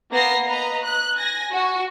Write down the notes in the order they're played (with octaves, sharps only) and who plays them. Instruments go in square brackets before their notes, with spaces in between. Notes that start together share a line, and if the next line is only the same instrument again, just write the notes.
[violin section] A#3 B3 A#6 C7
B4 D#5 A#5
F#6
G#5 A#6
F#4